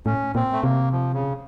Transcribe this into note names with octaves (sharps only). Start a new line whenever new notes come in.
A2 C#4
A#2 C4
A3
C3 A#3
F3
C#3